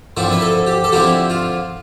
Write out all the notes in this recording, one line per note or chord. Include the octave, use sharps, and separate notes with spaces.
D3 F3 C4 E4
B4
A4
G4
A4
D3 F3 C4 E4 G4
F4